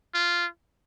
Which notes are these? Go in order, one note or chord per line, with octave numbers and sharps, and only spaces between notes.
F4